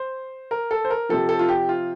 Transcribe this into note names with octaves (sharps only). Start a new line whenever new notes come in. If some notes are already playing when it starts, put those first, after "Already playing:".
Already playing: C5
A#4
A4
C5
A#4
C3 F3 A4
A4
F4
G4
F4